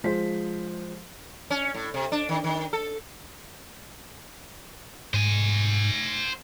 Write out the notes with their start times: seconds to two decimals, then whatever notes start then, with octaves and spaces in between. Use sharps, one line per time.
0.04 F3 G#3 C5 B6
1.50 C#4
1.74 A2
1.94 C3
2.12 D4
2.29 D#3
2.44 D#3
2.73 A4
5.14 G#2 C5 G#5